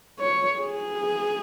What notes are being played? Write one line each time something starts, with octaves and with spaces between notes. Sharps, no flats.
C#5
G#4